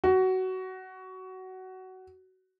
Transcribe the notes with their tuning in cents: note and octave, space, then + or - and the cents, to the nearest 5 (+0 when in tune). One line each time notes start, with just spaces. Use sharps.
F#4 +20